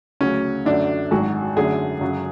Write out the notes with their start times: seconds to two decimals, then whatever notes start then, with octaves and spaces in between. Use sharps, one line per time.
0.21 D2 C#3 F#3 C#4
0.66 F#2 D3 A3 D4
1.11 G#1 G#2 F#3 F#4
1.57 F#2 D3 A3 G#4
2.01 F#2 C#3 F#3